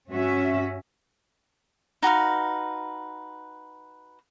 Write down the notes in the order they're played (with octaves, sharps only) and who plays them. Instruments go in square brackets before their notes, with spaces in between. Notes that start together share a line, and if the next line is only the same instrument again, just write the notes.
[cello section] G2 C#4 F#4 E5
[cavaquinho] D#4 F#4 B4 F5